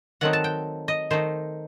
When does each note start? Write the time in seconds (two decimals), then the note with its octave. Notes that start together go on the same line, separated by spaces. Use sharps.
0.21 D#3 F#3 A3 C4 D#4 F#5
0.33 A5
0.44 G5
0.88 D#5
1.10 D#3 A3 D#4 C5